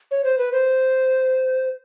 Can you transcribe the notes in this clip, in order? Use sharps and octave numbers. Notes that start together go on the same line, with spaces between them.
C#5
C5
B4
C5